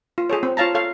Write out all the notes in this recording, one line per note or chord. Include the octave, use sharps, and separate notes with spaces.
F4
G#4 A4 C#5
C4
F4 C#5 F5 A5 A#5
A4 C#5 F5